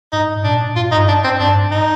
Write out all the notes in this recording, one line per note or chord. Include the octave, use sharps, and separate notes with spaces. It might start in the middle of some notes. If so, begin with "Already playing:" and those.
G#2 D#4
A#2 D4
G#2 F4
D#4
G2
D4
C4
G2 D4
G#2
D#4